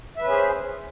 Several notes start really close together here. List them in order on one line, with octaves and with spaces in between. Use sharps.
E5 B4 C#4 G#4 C5